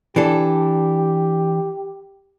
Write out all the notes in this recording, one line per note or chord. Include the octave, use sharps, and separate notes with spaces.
E3 D4 G4 A4